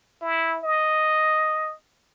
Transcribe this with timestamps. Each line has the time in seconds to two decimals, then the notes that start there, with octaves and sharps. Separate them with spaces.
0.22 E4
0.63 D#5